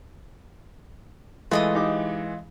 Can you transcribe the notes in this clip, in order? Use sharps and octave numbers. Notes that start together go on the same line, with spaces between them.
E3 G#3 A3 F4 D#5 D#6
D#4 G4 D6